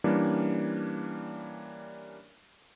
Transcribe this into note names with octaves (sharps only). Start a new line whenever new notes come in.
E3 G3 A#3 C#4 D4